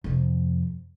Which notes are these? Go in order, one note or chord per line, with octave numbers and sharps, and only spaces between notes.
F2 C3